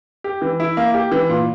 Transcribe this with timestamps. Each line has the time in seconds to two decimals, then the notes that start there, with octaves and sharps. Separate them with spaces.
0.24 G4
0.42 E3
0.60 E4
0.77 A#3
0.94 G4
1.12 E3
1.29 A#2